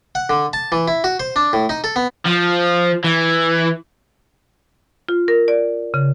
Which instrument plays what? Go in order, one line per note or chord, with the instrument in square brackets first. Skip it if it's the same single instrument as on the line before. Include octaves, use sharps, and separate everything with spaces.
[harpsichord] F#5
D3
A5
E3
E4
F#4
C5
D4
A2
D#4
A4
B3
[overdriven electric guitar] F3
E3
[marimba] F4
A#4
D5
C#3